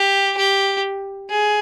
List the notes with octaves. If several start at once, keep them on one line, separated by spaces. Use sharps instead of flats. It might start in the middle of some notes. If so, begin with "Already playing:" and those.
Already playing: G4
G4
G#4